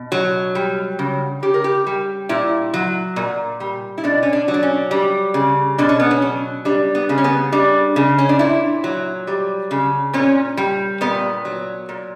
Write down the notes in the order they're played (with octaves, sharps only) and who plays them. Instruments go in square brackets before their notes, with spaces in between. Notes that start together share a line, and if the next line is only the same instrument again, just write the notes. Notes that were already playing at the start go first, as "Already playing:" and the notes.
Already playing: [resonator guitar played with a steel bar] B2
F#3
G3
C#3
C#3 G4
A#4
G4
G3
A#2 E4
F#3
A#2
G3
E4
B2 D4
C#4
D4
F#3
D4
C#4
G3
C#3
B2 D4
C#4
B3
C#4
F#3
G3 D4
B3
C#3
C#4
B3
G3 D4
C#3
C#4
D4
A#2 E4
F#3
G3
C#3
A#2 C#4
G3
A#2 B3
F#3
A#2